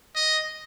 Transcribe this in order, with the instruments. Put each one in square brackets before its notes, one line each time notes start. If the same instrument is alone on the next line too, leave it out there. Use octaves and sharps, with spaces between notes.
[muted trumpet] D#5